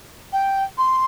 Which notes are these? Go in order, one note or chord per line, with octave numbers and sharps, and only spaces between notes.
G5
C6